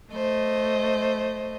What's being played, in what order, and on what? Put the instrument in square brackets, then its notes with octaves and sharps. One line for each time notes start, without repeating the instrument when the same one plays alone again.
[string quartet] A3 C5 D#5